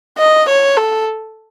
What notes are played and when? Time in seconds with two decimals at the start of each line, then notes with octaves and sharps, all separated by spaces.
0.18 D#5
0.48 C#5
0.77 A4